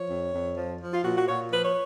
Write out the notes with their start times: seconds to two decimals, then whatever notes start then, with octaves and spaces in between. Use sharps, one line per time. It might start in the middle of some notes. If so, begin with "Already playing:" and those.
Already playing: F3 C#5
0.09 F2
0.33 F2
0.57 F3
0.81 F3
0.93 F4
1.05 A#2 F#4
1.16 F#4
1.28 A#2 C#5
1.52 F3 B4
1.64 C#5